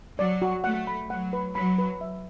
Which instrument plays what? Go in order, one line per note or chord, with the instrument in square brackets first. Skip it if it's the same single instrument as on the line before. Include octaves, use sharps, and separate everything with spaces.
[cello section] F#3 [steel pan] D5
[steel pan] F#4
[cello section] A3 [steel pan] F#5
[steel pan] B5
[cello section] F#3 [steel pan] F#5
[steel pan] B4
[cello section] F#3 [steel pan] B5
[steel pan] B4
E5